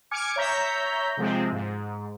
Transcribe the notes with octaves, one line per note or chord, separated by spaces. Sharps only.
G#5 D6 F6 G#6 C#7
C#5 E5 A#5 G6 B6
C3 F3 G#3 C4
G#2